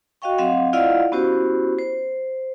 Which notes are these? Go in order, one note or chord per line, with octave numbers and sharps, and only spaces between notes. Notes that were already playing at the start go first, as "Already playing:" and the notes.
F#4 D#5 F5 G5 C#6
F#3 C4 D#5 F5 F#5
E4 F4 D5 D#5 F5 F#5
B3 C#4 E4 F#4 G4 C5
C5